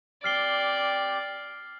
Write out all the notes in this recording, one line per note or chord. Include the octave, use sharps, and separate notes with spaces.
C4 G4 D5 F6 C7 G7